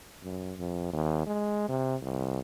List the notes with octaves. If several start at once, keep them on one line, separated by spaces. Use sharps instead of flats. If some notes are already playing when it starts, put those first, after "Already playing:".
F#2
F2
D#2
G#3
C3
C2